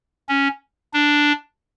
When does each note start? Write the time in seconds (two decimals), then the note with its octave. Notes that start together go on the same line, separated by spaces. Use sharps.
0.29 C#4
0.94 D4